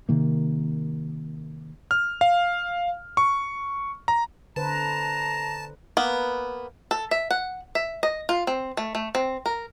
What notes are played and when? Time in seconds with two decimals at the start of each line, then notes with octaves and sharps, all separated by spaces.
0.09 C3 D#3 A#3
1.91 F6
2.21 F5
3.17 C#6
4.08 A#5
4.56 D3 B4 C5 A5 A#5
5.97 A#3 B3
6.91 A4
7.11 E5
7.31 F#5
7.75 E5
8.03 D#5
8.29 F4
8.47 C4
8.77 A3
8.95 A3
9.15 C4
9.46 A#4